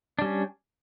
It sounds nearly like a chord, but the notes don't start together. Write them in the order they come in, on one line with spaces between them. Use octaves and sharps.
D4 G3 C#4